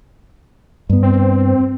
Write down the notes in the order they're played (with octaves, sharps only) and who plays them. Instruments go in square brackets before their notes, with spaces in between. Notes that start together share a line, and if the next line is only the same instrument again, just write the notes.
[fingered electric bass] G2 B3
[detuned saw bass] C4